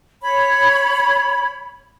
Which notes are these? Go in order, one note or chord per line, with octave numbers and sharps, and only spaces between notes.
C#5 B5